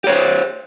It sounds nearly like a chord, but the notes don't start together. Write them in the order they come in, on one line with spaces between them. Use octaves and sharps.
G4 C#5 C5